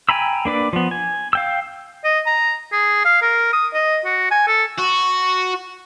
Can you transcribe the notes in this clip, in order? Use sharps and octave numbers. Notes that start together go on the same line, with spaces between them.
G5 G#5 A#5 B5 E6
A#3 D4 B4 D5
F3 B3
G#5
F5 G5 E6
D#5
A#5
G#4
F5
A#4
D#6
D#5
F#4
G#5
A4
F#4